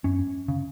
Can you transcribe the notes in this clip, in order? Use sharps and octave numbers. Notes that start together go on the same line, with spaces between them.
F#2 C#4
C#3